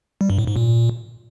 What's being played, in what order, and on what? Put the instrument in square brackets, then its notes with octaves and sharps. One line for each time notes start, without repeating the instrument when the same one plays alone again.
[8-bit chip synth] G3
G2
A2
G#2
A#2